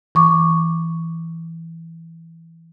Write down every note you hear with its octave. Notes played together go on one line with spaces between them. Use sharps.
E3 C#6 D6